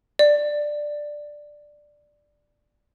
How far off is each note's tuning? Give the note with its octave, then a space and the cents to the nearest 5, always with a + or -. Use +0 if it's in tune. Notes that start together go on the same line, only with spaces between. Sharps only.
D5 +5